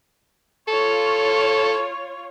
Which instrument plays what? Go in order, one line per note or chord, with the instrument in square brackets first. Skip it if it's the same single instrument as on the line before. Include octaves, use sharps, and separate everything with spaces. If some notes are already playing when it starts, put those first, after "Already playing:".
[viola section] F4 C#5 [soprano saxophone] A4